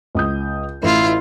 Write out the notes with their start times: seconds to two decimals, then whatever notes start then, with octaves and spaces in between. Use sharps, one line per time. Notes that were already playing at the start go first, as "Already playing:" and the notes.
0.15 C#2 D#6 G6
0.83 A1 E4 F4